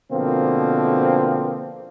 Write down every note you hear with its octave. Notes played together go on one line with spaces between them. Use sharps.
B2 D3 F3 A#3 C4